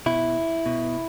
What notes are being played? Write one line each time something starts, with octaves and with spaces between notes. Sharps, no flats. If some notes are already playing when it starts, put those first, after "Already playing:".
B2 E4
B2